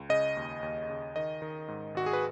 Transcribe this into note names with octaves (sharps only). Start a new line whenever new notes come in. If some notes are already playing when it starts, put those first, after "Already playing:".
Already playing: C#2
C#3 D#5
D#2
D#2
C#3
D#3 D#5
D#3
G#2
G#1 F#4
G#4
B4